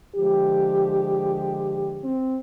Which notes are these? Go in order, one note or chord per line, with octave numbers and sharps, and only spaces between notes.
D3 F3 G#3 G4
C4